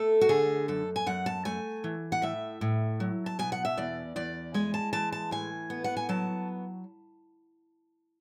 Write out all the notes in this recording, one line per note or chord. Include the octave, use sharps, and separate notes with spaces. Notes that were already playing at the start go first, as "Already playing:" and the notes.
Already playing: A3 A4
F#4
D3 G#4
F#2 A4
G#5
F#2 F#5
A5
A3 G#5
E3
F#5
A2 E5
A2
F#3
A5
B2 G#5
F#5
E5
E2 D5
E2 D5
G#3 G#5
A5
E3 A5
A5
A2 G#5
B3
F#5
G#5
F#3 A5